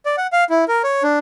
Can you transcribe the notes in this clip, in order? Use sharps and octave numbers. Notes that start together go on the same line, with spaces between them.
D5
F#5
F5
E4
A#4
C#5
D4